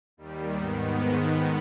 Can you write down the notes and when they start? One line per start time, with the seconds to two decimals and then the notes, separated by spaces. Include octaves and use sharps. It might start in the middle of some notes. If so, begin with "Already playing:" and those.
0.17 D#2 D#3 G3
0.56 G#2 D#3 B3